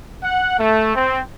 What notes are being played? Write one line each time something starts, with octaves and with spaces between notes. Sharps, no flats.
F#5
A3
C4